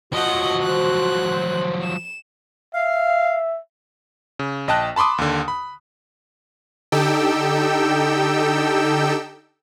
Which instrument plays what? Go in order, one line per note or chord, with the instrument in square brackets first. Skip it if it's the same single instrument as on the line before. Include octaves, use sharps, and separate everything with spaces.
[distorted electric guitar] F3 F#3 [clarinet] F#4 [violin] D#5 F#5
[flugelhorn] C5 [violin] F#6
[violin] E7
[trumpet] E5 [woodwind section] F5
[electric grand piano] C#3
A#1 D#5 G5 A5 F#6
A5 B5 C6 D6 D#6
D#2 D3
B5
[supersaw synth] D3 D#4 G4 A4 G5 E6